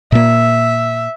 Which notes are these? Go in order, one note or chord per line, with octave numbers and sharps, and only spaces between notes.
A#2 A#3 E5